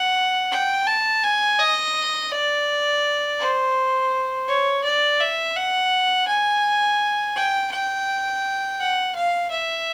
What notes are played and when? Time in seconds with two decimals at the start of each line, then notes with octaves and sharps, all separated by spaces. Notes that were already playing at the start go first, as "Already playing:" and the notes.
Already playing: F#5
0.52 G5
0.87 A5
1.24 G#5
1.59 D#5
2.32 D5
3.40 C5
4.48 C#5
4.84 D5
5.20 E5
5.56 F#5
6.28 G#5
7.36 G5
7.72 G5
8.80 F#5
9.15 F5
9.51 E5